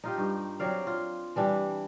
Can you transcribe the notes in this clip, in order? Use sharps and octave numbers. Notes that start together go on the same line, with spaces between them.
D#4 F4 G4
G2
F#3 C4 D5 F5
F4
E3 G3 D4